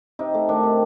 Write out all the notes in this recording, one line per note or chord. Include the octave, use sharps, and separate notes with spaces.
C3 D#4
A3
D#3 D4
C3